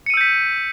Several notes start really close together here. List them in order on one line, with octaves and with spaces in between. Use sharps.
C#7 D#7 E6 G6 B6